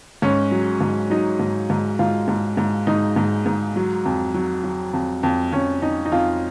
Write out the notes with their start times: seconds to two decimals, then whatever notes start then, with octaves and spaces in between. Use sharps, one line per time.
0.22 G#2 C#4
0.51 F#3
0.81 G#2
1.10 F#3 D#4
1.40 G#2
1.70 G#2
1.99 G#2 F4
2.28 G#2
2.57 G#2
2.87 G#2 D#4
3.16 G#2
3.46 G#2
3.76 F#3
4.05 F2
4.34 F#3
4.64 F#3
4.93 F2
5.23 F2
5.52 F2 C#4
5.82 F2 D#4
6.06 D#4
6.12 F2 F4